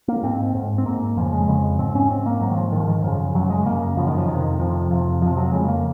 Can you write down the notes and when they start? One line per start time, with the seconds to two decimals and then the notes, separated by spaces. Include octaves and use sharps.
0.08 A#3
0.23 G#2 C4
0.54 G#2
0.78 C4
0.86 G#2 A#3
1.17 F2 C#3 F3
1.33 G#3
1.48 F2 C#3
1.79 G#2 C4
1.95 C#4
2.10 G#2 C4
2.26 A#3
2.41 G#2 F#3
2.50 D#3
2.57 F3
2.72 G#2 D#3
2.80 F3
2.88 D#3
3.03 F#2 C#3 F3
3.35 F#2 C#3 F#3
3.50 G#3
3.66 F#2 C#3 A#3
3.97 F#2 C#3 F3
4.07 D#3
4.18 F3
4.28 F2 C3 D#3
4.60 F2 C3 F3
4.91 F2 C3
5.22 F2 C3 F3
5.37 F#3
5.52 F2 C#3 G#3
5.68 A#3